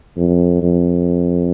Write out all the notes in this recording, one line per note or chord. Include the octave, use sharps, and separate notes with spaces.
F2
F2